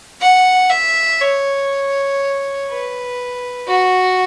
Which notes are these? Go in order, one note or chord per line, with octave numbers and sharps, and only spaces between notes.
F#5
E5
C#5
B4
F#4